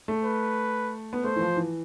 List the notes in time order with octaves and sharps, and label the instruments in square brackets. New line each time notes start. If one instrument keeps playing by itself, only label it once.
[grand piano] A3
[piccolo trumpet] B4
[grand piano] B3
[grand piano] A3 [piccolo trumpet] C5
[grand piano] E3
F3
E3